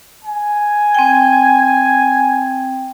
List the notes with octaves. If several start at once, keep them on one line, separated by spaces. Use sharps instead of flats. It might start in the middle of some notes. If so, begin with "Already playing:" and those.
G#5
C4 G5